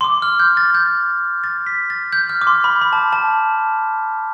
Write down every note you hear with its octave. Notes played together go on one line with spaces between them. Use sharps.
C6
D6
F6
G6
A6
G6
A6
B6
A6
G6
F6
D6
C6
B5
B5
A5
A5